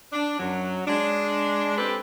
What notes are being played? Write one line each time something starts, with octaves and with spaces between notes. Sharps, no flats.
D4
F#2 F#3
G#3 D4
G#3 C4 G4 A4 B4